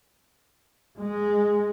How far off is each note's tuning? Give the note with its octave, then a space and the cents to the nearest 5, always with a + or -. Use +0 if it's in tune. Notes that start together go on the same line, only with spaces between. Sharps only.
G#3 -5